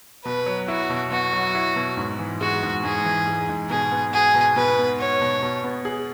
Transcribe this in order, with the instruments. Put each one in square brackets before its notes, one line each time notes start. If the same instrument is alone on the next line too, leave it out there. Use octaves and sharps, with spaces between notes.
[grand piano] B2 [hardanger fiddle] B4
[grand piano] F#3
[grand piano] E4 [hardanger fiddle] F#4
[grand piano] B2
[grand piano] B2 [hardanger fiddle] F#4
[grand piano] F#3
E4
B2
G#2
E3
[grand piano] G#3 [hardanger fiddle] F#4
[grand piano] G#2
[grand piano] G#2 [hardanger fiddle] G#4
[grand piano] E3
G#3
G#2
[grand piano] B2 [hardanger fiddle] G#4
[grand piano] B3
[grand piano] F#4 [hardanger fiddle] G#4
[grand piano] B2
[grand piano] B2 [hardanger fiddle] B4
[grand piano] B3
[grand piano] F#4 [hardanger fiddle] C#5
[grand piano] B2
B2
B3
G#4